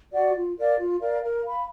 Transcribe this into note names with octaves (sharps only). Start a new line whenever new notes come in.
F#4 D5 F#5
F4
A#4 D5 F5
F4
A#4 D5 F5
A#4
F5 B5